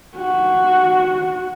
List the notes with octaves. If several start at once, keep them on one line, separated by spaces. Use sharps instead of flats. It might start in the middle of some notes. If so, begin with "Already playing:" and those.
F#4